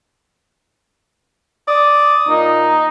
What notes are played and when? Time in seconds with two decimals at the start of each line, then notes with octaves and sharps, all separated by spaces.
1.68 D5 D#6
2.29 A#2 D#4